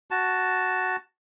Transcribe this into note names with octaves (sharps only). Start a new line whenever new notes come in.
F#4 A5